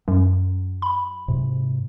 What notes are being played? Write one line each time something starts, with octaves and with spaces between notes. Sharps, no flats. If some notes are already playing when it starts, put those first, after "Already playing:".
F#2 F#3
B5
G#2 C3